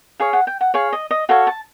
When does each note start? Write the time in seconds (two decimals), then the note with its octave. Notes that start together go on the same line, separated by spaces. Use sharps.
0.20 G#4 C#5 F5
0.33 F#5
0.47 G5
0.61 F#5
0.74 G#4 C#5 F5
0.92 D#5
1.11 D#5
1.29 F#4 A4 C#5 F5
1.47 A5